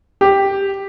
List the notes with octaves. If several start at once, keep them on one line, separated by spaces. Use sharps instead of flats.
G4